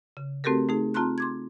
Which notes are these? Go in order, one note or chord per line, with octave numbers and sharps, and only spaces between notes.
C#3
A3 C4 F#4 G4 A4 A#4
A3 D#4 G#4
C4 F4 A5 A#5 C6 F#6
C6 D6 G#6